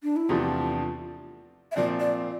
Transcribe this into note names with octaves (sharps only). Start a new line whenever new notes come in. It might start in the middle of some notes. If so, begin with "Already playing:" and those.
D4
E4
E2 C3 F3 A3 D4 F4
E5
A#2 F3 C4 D5
D5